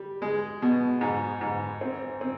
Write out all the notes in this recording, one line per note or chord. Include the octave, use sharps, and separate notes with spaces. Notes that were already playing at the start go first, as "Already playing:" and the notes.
Already playing: G3
G#3
B2
G#2
G#2
C4
C4